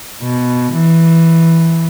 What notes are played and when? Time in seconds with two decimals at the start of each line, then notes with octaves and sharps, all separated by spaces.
0.22 B2
0.74 E3